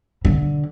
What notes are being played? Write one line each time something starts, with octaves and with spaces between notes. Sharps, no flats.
D3